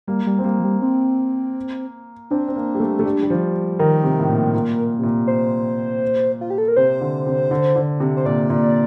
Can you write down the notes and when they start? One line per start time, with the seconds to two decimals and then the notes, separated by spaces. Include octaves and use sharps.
0.08 G3 A#3
0.26 G3
0.39 C4
0.44 G3 A#3
0.60 F3
0.64 G3
0.82 C4
2.31 C4 D4
2.48 C4
2.56 A#3
2.75 G3
2.80 A3
2.99 A3
3.06 G3
3.23 G3
3.30 F3
3.79 D#3 A#4
4.04 C3
4.20 A2
4.29 A#2
4.54 A#2
4.99 C3
5.03 A#2
5.27 C5
6.41 F4
6.50 G4
6.58 A4
6.68 A#4
6.76 C3 C5
7.01 D3
7.26 C3
7.51 D3
7.76 D3
8.00 C3
8.17 C5
8.25 A#2 D5
8.50 A#2